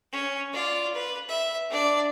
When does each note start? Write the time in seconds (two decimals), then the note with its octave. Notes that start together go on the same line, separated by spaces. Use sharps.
0.12 C#4
0.53 F4 D5
0.94 B4
1.29 E5
1.70 D4 D5